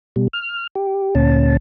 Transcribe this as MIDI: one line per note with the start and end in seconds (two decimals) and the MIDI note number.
0.16 0.28 47
0.16 0.28 55
0.33 0.67 89
0.75 1.15 67
1.15 1.57 38
1.15 1.57 46
1.15 1.57 61
1.15 1.57 81